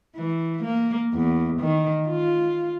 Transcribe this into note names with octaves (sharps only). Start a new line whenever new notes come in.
E3
A#3
E2
D#3
F4